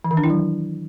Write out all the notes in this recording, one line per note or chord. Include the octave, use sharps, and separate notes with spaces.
E3
D#3
D4
E4
F#3